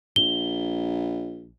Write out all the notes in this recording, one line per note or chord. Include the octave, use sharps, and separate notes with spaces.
A#1 G7